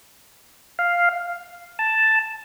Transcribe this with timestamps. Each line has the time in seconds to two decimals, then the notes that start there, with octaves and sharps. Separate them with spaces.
0.79 F5
1.79 A5